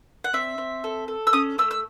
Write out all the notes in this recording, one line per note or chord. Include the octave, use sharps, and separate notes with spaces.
F#5
C4 E5
C4
A4
A4
E6
C#4 D#6
A3 E6
E6